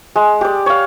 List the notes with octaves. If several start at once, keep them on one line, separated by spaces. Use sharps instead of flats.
G#3
G4 D5
C#5 F5